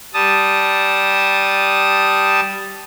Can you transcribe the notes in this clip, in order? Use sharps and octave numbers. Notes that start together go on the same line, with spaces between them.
G3 A5 D#6